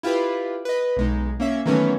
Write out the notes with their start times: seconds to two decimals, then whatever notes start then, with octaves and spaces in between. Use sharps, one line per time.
0.03 E4 F4 G4 B4 B5
0.65 B4 D#5
0.97 B1 G#3 D#4
1.40 A#3 C#4 E5
1.65 D#3 E3 F#3 A3 B3 C#4